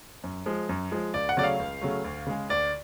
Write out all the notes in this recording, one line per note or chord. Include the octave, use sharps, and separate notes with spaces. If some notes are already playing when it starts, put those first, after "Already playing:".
F#2
F3 G#3
F#2
F3 G#3
C#2 D5
F#5
C#3 F#3 A3 D5
F5
C#2
C#3 F#3 A3
D2
C#3 G#3
D2 D5